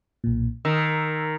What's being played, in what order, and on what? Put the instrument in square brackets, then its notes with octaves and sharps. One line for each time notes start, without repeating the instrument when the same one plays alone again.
[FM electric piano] B1 A#2
[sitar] D#3 [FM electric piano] E6